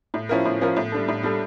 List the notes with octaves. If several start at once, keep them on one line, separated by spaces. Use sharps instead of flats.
A2
F3 C#4 E4 A#4
A2
F3 C#4 E4 A#4
A2
G3 D4 A4
A2
G3 D4 A4